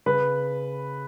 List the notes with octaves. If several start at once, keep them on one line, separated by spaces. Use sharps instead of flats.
C#3 B4 B5